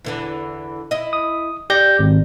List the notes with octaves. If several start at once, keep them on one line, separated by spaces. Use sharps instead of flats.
E2 D3 E3
E4 D#5
D#6
G4 D5 G6 A#6
G#1